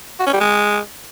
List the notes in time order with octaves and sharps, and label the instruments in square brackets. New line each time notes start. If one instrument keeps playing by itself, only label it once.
[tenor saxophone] F#4
C#4
G3
G#3